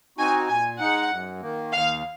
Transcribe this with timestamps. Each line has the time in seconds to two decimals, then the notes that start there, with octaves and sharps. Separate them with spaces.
0.18 C4 D#4 F#4 G#5
0.48 A#2 G#5
0.79 G#3 D#4 F#5
1.10 F#2
1.42 D#3 A#3
1.72 D#2 F5